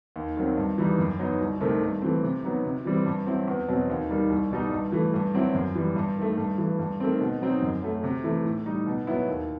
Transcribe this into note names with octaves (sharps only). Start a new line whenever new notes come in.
D#2
D#3 F#3 C4
G2
E3 G3 D#4
F#2
F#3 B3 D#4
C2
C3 D#3 A3 C4
G2
E3 A3 C4
C3
F#3 B3 D#4
C3
E3 G3 C4
G2
F#3 C4 E4
E2
B2 F#3 C4
D#2
D#3 G3 D#4
C2
B2 G3 D#4
G2
E3 A3
G2
F#3 C4 E4
F#2
E3 G3
G2
D#3 A3
G2
E3 A3
G2
D#3 A3 C4
B2
F#3 C4 D#4
F#2
F#3 A3
C3
E3 A3 E4
A2
G3 D#4
B2
F#3 B3 E4
D#2